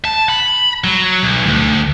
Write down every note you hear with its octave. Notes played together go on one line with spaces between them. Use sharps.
A5
B5
F#3
B1
D2